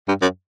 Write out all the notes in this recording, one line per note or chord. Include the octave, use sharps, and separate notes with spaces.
G2
F#2